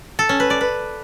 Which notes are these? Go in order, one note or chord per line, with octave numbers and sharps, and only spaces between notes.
A4
C#4
B4
D5
B4